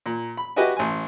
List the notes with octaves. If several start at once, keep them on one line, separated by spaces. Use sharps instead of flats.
A#2
B5
F#4 G4 B4 D#5 E5 G#5
A1 G#5